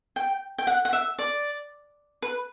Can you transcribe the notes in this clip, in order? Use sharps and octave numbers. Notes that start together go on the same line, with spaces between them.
G5
G5
F#5
F#5
E5
D5
B4